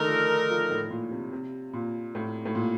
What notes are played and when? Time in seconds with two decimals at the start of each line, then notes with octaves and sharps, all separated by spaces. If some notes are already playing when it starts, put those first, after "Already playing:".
Already playing: D3 D#3 A3 D#4 A#4
0.08 F3
0.50 F3
0.71 A2
0.90 A#2
1.11 C3
1.32 C3
1.73 A#2
2.15 A2
2.45 A2
2.55 A#2